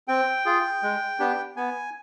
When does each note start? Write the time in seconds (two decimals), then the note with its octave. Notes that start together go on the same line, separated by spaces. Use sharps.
0.08 C4 G5
0.46 F4 G#4
0.82 G#3
1.19 B3 D4 G4
1.56 B3 G#5